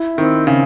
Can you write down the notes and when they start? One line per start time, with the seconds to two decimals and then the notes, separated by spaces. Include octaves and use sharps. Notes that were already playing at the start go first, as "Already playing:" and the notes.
Already playing: E4
0.18 D#3 C4
0.47 C#3 C4